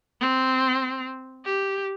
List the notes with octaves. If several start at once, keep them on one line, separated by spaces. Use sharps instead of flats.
C4
G4